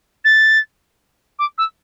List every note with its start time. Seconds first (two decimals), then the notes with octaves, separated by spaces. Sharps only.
0.24 A6
1.39 D6
1.58 E6